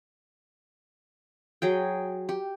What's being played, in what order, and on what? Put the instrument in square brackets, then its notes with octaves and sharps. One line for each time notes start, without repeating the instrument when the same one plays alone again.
[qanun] F#3 G#4 G5
G4